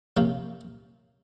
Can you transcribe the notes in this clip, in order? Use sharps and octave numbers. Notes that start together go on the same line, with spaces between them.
C3 F3 A#3 C#4 F4